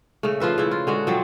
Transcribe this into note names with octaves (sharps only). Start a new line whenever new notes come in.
C#3 A3
F3 F4 B4 E5
C#3 E4
F4
D3 G#3 F#4
F3 F#3 C4